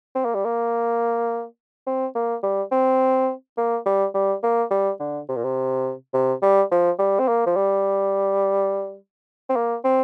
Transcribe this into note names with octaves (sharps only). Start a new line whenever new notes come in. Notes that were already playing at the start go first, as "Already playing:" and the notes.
C4
A#3
G3
A#3
C4
A#3
G3
C4
A#3
G3
G3
A#3
G3
D3
C3
A#2
C3
C3
G3
F3
G3
C4
A#3
F3
G3
C4
A#3
C4